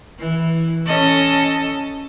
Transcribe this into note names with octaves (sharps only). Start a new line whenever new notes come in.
E3
C#4 A4 D#5